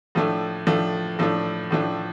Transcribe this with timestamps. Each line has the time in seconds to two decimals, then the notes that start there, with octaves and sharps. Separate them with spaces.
0.15 A2 F3 A3 D4
0.67 A2 F3 A3 D4
1.19 A2 F3 A3 D4
1.71 A2 F3 A3 D4